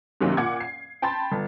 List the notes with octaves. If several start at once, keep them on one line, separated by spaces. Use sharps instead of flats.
F#2 C3 D#3 F#3 A#3 C#4
A#2 F#5 D6 G#6
C7
G5 A5 B5 C6 A6
G1